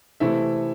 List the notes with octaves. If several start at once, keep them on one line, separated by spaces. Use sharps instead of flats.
C3 E3 A3 C4 E4 E5